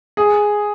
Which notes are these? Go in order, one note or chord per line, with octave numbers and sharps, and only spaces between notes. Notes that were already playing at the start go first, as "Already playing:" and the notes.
G#4